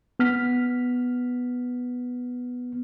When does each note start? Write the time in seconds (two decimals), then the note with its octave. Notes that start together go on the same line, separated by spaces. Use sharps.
0.19 B3 F6 B6